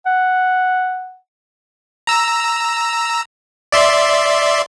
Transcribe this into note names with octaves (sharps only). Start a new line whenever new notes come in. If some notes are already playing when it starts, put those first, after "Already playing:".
F#5
A#5 E6
D5 E5 C6